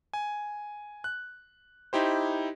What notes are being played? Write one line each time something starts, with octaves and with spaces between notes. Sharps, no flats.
G#5
F#6
D#4 E4 G4 C5